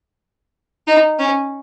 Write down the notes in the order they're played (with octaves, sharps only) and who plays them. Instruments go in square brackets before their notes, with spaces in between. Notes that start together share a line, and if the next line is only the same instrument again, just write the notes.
[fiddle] D#4
C#4